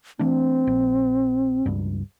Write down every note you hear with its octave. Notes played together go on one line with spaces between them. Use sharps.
E3 A3 C4 D4
A#1
C#2 G2